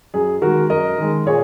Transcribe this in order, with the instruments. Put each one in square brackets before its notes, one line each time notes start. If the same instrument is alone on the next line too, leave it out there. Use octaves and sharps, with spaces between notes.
[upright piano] F#2 G#4
D#3 G#3 F#4 A#4
F#2 A#4 D#5
D#3 G#3
A#2 G#4 C#5